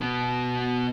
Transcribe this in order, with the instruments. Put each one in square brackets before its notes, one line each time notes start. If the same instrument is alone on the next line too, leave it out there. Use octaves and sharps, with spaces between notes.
[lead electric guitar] B2 B3